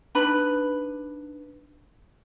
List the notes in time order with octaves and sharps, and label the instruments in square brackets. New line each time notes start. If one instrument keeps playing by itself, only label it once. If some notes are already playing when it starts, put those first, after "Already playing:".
[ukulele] D4 D#4 B4 B5